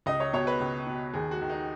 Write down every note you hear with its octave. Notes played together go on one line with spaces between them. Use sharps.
C#2 D#5
C#5
B2 C#5
B4
C#2
B2
D#2 G#4
F#4
D#3
D#4